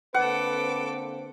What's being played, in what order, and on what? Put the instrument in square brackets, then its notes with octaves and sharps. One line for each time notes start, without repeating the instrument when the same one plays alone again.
[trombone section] D3 A#3 C4 [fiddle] A4 D6 [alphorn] B4 [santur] F#5